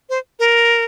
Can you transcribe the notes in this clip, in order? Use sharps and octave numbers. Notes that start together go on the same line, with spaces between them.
C5
A#4